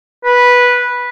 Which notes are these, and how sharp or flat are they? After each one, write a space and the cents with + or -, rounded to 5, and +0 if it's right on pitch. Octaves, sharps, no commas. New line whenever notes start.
B4 -10